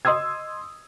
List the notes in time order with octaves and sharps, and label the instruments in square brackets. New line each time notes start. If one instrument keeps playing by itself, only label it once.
[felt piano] D#5 C6 D#6 E6 G#6